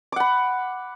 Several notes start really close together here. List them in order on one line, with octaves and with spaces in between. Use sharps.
D6 F#5 B5